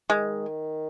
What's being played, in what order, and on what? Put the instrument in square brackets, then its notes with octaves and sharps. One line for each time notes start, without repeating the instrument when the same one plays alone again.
[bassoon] D#3 [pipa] G#3